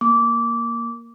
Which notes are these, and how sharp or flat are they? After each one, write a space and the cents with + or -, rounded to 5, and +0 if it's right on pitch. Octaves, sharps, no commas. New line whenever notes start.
A#3 +0 D6 -20